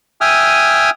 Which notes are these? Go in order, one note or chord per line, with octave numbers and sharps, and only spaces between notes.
E5 G5 G#5 D#6 F6